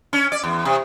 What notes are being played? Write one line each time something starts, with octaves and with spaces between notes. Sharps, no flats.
C#4
D5
E2
C3